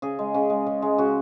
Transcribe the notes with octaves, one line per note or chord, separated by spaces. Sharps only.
C#3 G#4
G#3
C#3
G#3
C#3
G#3
C#3 F#4